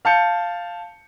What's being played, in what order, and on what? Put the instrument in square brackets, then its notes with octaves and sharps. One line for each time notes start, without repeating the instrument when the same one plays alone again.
[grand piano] F5 A5 G6 C#7